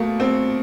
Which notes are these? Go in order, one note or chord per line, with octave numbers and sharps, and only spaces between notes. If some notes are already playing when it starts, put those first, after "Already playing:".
Already playing: B2 A3 A#3
C4